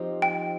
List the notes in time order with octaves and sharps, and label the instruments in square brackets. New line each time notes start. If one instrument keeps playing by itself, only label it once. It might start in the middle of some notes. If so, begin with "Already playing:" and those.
Already playing: [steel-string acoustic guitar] F3 C4 D#4 G4
[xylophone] G5